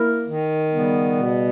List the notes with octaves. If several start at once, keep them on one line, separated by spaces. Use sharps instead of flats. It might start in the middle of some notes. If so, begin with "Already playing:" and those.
Already playing: A#3 E4 A#4
D#3
C#3 G3 B3
B2